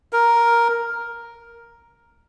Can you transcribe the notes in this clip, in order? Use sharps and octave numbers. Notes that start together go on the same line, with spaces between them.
A#4